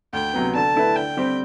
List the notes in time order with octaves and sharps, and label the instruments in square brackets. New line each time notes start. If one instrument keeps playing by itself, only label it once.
[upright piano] D2 [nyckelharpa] G5
[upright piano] C3 F#3 B3
[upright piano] D3 [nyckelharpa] A5
[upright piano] A3 E4 B4
[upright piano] D3 [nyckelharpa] G5
[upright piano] G3 C4 G4 C5